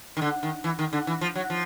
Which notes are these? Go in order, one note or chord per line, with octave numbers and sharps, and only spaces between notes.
D#3
D3
D#3
E3
D#3
D3
E3
F3
F#3
F3